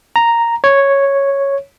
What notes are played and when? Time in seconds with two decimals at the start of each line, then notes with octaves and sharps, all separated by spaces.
0.16 A#5
0.64 C#5